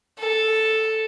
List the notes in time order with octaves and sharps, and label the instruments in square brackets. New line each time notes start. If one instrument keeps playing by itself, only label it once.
[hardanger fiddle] A4